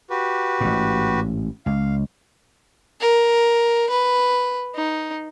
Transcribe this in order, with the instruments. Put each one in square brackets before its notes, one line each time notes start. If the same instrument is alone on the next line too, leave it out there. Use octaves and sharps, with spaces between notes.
[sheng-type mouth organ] F#4 G4 B4
[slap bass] A1 G#2
[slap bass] C#2 [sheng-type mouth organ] F5
[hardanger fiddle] A#4
B4
D#4